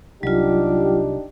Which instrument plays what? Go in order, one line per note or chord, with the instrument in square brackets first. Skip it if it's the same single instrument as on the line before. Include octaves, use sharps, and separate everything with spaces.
[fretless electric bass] C2 [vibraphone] F#3 F4 [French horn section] D4 D#4 G4